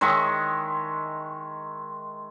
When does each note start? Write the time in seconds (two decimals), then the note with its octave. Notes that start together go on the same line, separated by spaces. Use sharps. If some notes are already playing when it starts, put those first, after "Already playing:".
0.01 D#3 G#3 E5 C#6